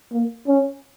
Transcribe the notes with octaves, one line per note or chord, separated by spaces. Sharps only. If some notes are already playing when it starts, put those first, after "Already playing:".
A#3
C#4